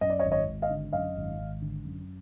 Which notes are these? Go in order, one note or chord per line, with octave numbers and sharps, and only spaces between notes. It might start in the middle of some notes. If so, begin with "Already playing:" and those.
F#2 D#5
D5
C#5 D#5
G#1
C#5 D#5
G#1
D#5 F5
D3
F#2 D#5 F5
G#1
G#1
D3
F#2